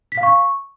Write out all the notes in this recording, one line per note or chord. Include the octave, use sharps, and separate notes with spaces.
B6
F5
C#6